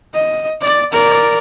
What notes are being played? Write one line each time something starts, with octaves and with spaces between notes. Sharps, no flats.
D#5
D5
A#4 D5